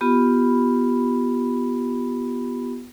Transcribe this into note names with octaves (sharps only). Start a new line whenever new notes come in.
B3 F4 G4 B5